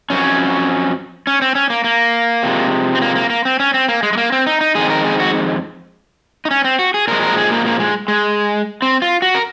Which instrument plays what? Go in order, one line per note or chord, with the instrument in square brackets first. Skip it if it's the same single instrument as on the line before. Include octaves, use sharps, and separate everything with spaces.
[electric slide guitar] F2 D#3 F#3 C#4
C#4
C4
C#4
A#3
A#3
C3 F3 G#3
C4
A#3
A#3
A#3
C4
C#4
C4
A#3
G#3
G#3
A#3
C4
D#4
D#4
F2 D#3 G#3 G#4
A#4
G#4
F#4
D#4
C#4
C4
F#4
G#4
A#2 F3 G#3 A#4
A#4
G#4
A#3
A#3
G#3
G#3
C4
F4
F#4
A#4